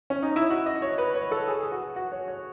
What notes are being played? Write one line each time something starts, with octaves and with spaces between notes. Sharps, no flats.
C#4
D#4
E4
F#4
D#5
C#5
B4
C#5
A4
G#4
G#4
F#4
F#4
C#5
C#5